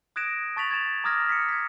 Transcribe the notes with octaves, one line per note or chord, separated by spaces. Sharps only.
D#6 F#6 G#6 A#6 D7 E7
A5 C#6 A6 B6 F7 F#7
G#6 A6 E7 F7
A#5 D6 D#6 F6 G#6 A#6
B6 C#7
G#6 B6